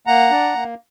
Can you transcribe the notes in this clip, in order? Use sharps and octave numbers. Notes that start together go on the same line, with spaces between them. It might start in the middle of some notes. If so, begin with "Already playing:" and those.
A#3 F#5 A#5
D4
A#3